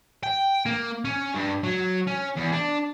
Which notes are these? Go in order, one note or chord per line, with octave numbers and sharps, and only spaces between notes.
G5
A#3
C#4
G2
F#3
C#4
E2
D4